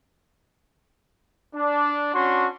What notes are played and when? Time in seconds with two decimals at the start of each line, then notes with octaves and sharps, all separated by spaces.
1.55 D4
2.13 C#4 D4 F#4 C6